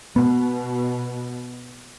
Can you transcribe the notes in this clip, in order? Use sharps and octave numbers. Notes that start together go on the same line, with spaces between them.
B2 B3